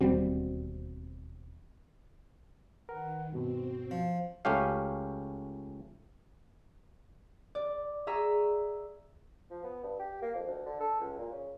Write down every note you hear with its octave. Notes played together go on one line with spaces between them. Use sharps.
E1 D#2 G3 C4 F#4
D#3 A#4 B4 F#5
G2 B2 C4 F#4
F3
C#2 A3 C#4 G4 F5
D5
G#4 E5 A#5 C#6 E6
F3
B3
G2
G4
A#3
F2
D2
D3
A4
C#2
A#2
C#3